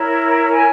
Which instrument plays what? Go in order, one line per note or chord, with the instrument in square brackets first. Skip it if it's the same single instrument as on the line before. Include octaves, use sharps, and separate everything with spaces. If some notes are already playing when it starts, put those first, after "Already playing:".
Already playing: [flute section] E4 A#4 C#5
G#5